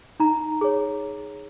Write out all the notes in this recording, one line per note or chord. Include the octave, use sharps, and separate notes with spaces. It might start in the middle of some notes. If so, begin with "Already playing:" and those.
D#4 A#5
G#4 C#5